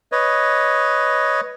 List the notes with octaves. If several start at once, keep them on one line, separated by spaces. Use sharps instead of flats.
B4 C#5 D#5